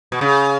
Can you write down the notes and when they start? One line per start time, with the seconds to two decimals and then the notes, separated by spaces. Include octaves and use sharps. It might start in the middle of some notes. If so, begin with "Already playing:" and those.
0.12 B2
0.21 C#3